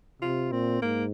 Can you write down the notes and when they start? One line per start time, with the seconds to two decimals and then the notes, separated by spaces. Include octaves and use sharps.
0.22 C3 F4
0.52 A#2 C4
0.81 G#2 A#3